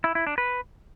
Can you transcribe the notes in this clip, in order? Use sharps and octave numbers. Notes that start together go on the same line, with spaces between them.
E4
E4
D4
B4